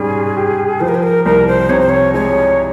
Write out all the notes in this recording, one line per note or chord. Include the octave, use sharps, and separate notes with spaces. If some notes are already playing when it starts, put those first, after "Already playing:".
Already playing: G#2 G3 C#4 G#4
G4
F3 C5
A#4
C5
A#4
C2 A#4
C5
C3 C#5
C5
C#5
G#3 C#5